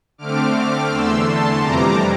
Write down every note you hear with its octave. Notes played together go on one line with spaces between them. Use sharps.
D3 A3 C4 D6 F6
D6 F6
E2 D3 A3 C6 E6
A5 C6
F2 C3 E3 G3 A#5 D6